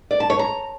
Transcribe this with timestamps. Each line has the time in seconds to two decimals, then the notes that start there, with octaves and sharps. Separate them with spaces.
0.11 D5
0.20 A5
0.30 C#5
0.39 A#5